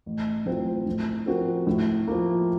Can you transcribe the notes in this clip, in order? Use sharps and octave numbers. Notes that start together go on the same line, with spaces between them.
A1
A2 F#3 C4 F4
A2
F3 C4 F#4 A#4
A2
F3 A#3